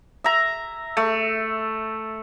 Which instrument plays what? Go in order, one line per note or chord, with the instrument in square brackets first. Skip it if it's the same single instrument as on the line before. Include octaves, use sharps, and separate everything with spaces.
[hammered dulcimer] E5 A#5
A3